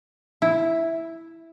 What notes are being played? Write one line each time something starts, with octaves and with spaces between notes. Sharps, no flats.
E4